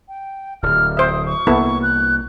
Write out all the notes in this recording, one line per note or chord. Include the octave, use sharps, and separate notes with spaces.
G5
D1 F6
C5 E5 D#6
C#6
C2 A#3 B3 E4 A4
F#6